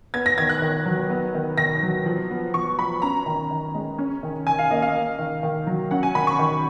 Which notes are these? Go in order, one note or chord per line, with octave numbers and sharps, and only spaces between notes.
B3 G#6
A#6
D#3 G#6
F#6
D#3
F#3
B3
D#3
D#3 A#6
F#3
F3
B3
F3 C#6
B3 B5
C#4 A#5
D#3
D#3
G#3
C#4
D#3
D#3 G#5
F5
A#3 D#5
F5
A#3
D#3
D#3
F#3
C#4 F#5
G#5
D#3 B5
C#6
D#3